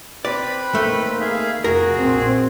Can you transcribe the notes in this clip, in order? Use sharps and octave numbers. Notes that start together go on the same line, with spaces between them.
C4 B4 D5 B5
D#3 A3 A#3
G#4 E5 F5
F1 F2 F#4 G#4 A#4
A#1 C4